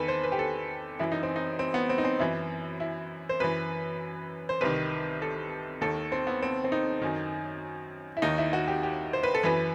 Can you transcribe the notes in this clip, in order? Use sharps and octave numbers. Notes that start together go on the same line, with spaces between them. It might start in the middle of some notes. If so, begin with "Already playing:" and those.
Already playing: E2 D#3 A4 B4
C5
B4
G4
A4
F#2 E3 E4
D#4
C4
D#4
C4
B3
C4
D#4
C4
F#2 E3 E4
E4
C5
F#2 E3 B4
C5
C2 C3 D#3 B4
A4
D#2 D#3 A4
C4
B3
C4
C4
D#4
F#2 D#3
E4
D#2 D#3 D#4
E4
F#4
G4
G4
C5
B4
A4
F#2 E3 B4